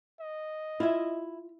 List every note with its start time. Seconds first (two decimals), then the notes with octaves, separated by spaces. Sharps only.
0.20 D#5
0.80 E4 F4 E5